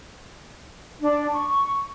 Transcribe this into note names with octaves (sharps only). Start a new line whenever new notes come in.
D4
C#6